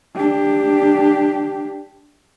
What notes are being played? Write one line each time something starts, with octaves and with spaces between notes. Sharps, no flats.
D4 G4